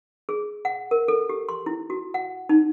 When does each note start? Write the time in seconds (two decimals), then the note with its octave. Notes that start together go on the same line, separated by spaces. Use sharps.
0.29 G#4
0.65 F#5
0.91 A#4
1.08 A4
1.29 G4
1.49 C6
1.66 E4
1.90 F#4
2.14 F#5
2.49 D#4